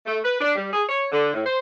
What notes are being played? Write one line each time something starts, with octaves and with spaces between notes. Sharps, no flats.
A3
B4
D4
G3
G#4
C#5
D3
A2
C5